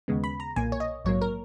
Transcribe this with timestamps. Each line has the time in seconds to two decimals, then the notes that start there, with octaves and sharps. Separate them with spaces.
0.08 D#2 C#3 G#3 B3
0.24 B5
0.40 A#5
0.56 B1 A#2 A#3 G#5
0.72 C#5
0.80 D#5
1.05 A#1 G#2 F#3 A#3 C#5
1.22 A#4